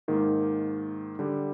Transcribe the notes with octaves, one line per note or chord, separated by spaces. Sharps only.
G#2 D#3 A#3
D3 G3